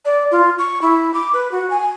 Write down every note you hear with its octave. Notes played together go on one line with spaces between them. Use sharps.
D5
F4
C#6
E4
D6
B4
F#4
G#5